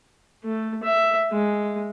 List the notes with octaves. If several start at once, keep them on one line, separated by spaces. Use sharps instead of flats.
A3
E5
G#3